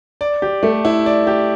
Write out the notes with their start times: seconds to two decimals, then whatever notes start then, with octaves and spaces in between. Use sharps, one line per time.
0.21 D5
0.42 G4
0.63 A3
0.85 E4
1.06 D5
1.27 G4